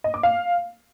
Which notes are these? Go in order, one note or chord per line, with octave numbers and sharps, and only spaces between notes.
D#5
D6
F5